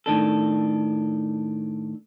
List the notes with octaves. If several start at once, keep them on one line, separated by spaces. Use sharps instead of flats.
A2 D#3 D4 A4